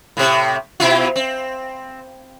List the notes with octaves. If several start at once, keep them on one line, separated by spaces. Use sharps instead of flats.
A2 C3
B2 E4 F4
C4